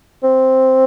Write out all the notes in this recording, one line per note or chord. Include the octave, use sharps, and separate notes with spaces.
C4